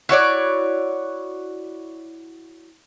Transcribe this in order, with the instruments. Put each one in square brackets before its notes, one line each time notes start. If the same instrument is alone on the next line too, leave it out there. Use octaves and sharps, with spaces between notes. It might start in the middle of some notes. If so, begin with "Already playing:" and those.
[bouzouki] E4 F#4 C#5 D5